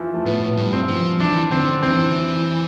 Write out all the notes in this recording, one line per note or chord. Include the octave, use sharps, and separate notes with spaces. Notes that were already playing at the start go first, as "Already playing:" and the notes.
Already playing: E3 F3
A3
A2 B3
G2
C4
F3
E3 D4
D3 C4
E3 C4